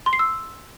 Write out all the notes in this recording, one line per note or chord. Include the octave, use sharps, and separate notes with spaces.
C6
C7
E6